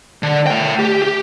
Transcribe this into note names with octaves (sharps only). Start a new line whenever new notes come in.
D3
A3 G5
G4
G4